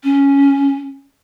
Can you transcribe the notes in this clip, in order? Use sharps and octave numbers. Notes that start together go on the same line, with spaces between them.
C#4